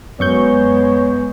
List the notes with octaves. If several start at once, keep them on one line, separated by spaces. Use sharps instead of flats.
F#2 G#3 B3 C#5 C#6 G6